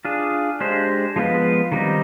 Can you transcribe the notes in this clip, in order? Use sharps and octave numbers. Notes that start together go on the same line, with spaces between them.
D4 F4 G#4
G#3 D4 G4 C5
F3 G#3 B3 F4 B4
D#3 G3 C4 D#4